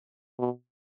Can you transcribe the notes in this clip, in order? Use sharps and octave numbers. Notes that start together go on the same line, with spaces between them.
B2